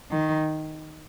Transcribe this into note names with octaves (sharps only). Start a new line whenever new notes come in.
D#3